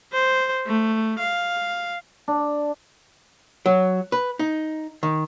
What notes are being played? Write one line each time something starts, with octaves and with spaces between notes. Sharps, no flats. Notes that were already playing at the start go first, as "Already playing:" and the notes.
C5
A3
F5
D4
F#3
B4
D#4
D#3